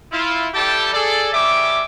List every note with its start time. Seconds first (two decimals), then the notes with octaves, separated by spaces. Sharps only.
0.12 E4 F4
0.54 G3 E4 G4 A4 G5 A5
0.94 G#4 A4 D5
1.33 G3 C#4 E5 D6